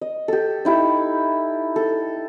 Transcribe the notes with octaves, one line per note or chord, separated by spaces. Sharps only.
D#5
G4 A4
D#4 E4 G4
A4